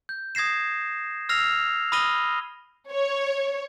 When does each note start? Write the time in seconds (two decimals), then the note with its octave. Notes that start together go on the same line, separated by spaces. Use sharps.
0.09 G6
0.35 D#6 G#6 A#6 C7 E7
1.29 E6 F6 A#6 C7 F7
1.92 B5 D#6 F6 A#6 D#7 G7
2.91 C#5